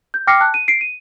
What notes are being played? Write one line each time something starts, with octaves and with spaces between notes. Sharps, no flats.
G6
G5 D6 F6 A#6 C7 C#7
A5 F#6
D#7
C7 D7
D#7